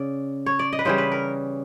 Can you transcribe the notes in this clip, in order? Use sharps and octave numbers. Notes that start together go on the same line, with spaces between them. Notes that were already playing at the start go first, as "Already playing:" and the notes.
Already playing: C#3 D5
C#5
D5
D#5
B4
C#3 E3 G3 C5
B4
A#4